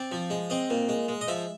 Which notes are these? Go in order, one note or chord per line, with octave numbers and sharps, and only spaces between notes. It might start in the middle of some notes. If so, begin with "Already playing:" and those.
Already playing: C4 D5
F3
G#3
C4 D#5
A#2
G#3
G#3
D#5
F3 E5